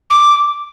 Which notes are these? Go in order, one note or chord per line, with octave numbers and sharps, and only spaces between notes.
D6